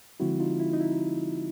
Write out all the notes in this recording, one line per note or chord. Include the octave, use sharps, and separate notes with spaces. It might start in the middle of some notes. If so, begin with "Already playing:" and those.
D3 F3 G#3 C4 E4 F#4
D#4 F4
E4
D#4
E4